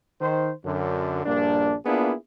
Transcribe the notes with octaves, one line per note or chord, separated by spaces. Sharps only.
D#3 C5
F#2 D3
A#1 G2 A#3 D4
A#3 B3 D4 E4 F4 G#4